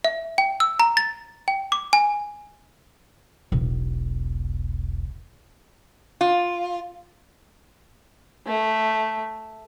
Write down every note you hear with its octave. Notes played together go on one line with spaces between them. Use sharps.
E5
G5
E6
A#5
A6
G5
D6
G#5
E1 B1
F4
A3